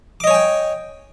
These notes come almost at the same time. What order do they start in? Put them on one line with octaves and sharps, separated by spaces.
D6 D#5 C#5 G#5 G5